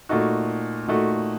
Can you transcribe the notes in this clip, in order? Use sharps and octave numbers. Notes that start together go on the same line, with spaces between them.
A#2 A3 D#4 F#4
A#2 A3 D#4 F#4